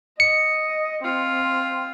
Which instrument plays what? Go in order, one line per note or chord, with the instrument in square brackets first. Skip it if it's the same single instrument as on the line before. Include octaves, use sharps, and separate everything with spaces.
[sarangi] D#5 [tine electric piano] C#7
[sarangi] C4 [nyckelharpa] F4